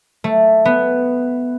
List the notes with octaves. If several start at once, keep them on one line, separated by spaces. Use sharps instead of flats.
A3
B3